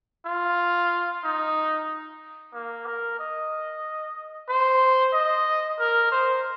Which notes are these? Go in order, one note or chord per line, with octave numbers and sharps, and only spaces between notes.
F4
D#4
A#3
A#4
D#5
C5
D#5
A#4
C5